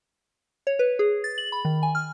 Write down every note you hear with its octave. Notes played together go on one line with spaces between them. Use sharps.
C#5
B4
G#4
A6
F#7
B5
D#3
G#5
F6